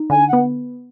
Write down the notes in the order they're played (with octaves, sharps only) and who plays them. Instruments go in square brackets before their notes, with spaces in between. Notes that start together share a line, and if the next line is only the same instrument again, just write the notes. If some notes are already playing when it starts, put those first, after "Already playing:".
Already playing: [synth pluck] D#4
[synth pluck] D3 [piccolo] G#5
[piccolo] F#5
[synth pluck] B3